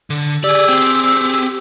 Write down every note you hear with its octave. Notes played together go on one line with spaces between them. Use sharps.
D3
G4 G#4 D5 E6
C4